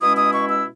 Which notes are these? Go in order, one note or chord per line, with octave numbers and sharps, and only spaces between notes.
B2 G#3 C#4 E4 D#6
D#6
C#6
E6